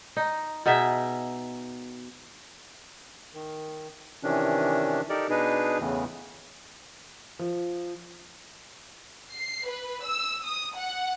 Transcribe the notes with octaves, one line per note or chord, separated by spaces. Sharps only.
D#4
B2 D#4 G#4 E5
D#3
C3 D#3 E3 C#4 D4
D#4 G4 A4 A#4 D5
B2 D4 D#4 G#4 B4
E2 A2 C#3 E3
F3
C7
B4
E6
D#6
F#5